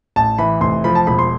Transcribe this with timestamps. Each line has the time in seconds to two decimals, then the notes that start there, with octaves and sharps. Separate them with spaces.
0.16 A1 A5
0.38 E3 B5
0.61 F1 C6
0.84 F3 B5
0.95 A5
1.07 E1 B5
1.19 C6